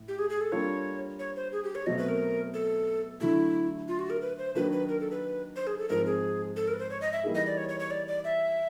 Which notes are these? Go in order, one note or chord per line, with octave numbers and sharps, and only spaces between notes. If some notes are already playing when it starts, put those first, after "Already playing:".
Already playing: A2
G4
G#4
G#4
A4
G3 A#3 D4 F4 A4 C#5
C#5
C5
G#4
G4
C#5
B2 F#3 A3 C4 D#5
B4
A#4
A4
D3 F#3 A3 E4
F4
F#4
A#4
B4
C5
D#3 F#3 A#3 D4 B4
B4
A#4
A4
B4
C5
G#4
A4
G#2 F3 G#3 C4 A#4
G#4
A4
A#4
B4
C5
C#5
D#5
E5
E3 G3 A#3 D#4 G#4
D#5
D5
C#5
C#5
C#5
D5
D5
E5